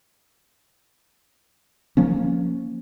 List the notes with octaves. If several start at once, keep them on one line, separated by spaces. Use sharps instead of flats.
F3 A#3 C#4